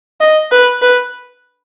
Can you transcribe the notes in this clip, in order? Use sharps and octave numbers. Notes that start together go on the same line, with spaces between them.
D#5
B4
B4